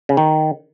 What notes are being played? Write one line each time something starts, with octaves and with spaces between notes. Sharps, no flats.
C#3
D#3